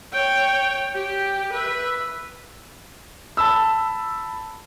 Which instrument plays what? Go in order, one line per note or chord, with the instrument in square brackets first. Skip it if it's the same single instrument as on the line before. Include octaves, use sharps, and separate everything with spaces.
[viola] C#5 G5
G4
B4 E5
[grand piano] A5 B5 E6